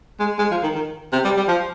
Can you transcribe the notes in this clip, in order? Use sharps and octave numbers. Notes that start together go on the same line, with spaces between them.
G#3
G#3
F3
D#3
D#3
C3
G3
G3
F3